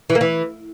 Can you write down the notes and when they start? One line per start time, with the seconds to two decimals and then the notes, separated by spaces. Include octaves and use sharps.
0.10 E3
0.15 A#3
0.21 E3